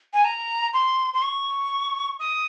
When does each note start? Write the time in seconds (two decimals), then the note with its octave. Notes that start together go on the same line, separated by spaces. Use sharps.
0.14 G#5
0.25 A#5
0.74 C6
1.14 C6
1.22 C#6
2.20 D#6